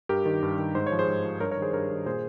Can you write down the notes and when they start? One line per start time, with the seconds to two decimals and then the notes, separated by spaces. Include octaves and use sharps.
0.09 G2 G4 A#4
0.26 D#3
0.43 G2
0.58 D#3
0.75 G#2 C5
0.87 C#5
0.92 F3
0.99 G#4 C5
1.08 G#2
1.24 F3
1.40 G2 A#4 C#5
1.51 A#4 C#5
1.57 D#3
1.62 G#4 C5
1.73 G2 A#4 C#5
1.90 D#3
2.06 A#2 G#4 C5